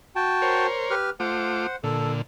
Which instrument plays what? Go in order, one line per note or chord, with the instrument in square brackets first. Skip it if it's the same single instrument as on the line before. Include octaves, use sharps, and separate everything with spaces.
[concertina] F#4 G5 A5
[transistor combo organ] A#4 C5 C#5
[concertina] G4 B4 F6
[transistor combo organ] A3 F4 D6 [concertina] C5 F#5
[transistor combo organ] A#2 D3 [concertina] A4